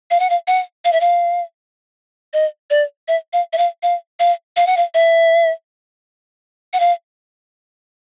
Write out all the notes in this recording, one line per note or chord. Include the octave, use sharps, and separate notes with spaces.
F5
F#5
F5
F#5
F5
E5
F5
D#5
D5
E5
F5
E5
F5
F5
F5
F5
F#5
F5
E5
F#5
F5